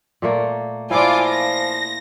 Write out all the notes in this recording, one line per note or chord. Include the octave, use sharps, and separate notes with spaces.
A#2 A3 A#3
F3 E4 F4 D5 G#5 D6
A#6